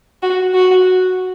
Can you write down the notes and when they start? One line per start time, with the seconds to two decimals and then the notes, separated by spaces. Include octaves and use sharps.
0.22 F#4
0.54 F#4